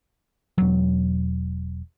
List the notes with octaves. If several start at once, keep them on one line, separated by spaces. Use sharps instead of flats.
E1 F#3